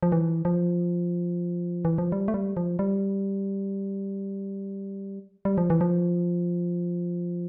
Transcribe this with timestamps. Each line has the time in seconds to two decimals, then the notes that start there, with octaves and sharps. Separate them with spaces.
0.03 F3
0.12 E3
0.45 F3
1.85 E3
1.98 F3
2.12 G3
2.28 A3
2.34 G3
2.57 F3
2.79 G3
5.45 G3
5.58 F3
5.70 E3
5.81 F3